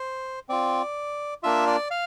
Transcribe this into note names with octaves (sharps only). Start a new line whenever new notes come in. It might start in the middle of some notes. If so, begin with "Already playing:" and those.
Already playing: C5
C4 F4 D5
A#3 D4 F4 E5
D5
F5